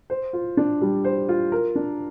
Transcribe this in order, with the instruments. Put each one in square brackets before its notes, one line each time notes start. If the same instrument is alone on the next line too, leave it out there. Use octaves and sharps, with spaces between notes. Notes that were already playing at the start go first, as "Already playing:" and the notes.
[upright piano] C5
F4
D4
G3
C5
F4
A#4
D4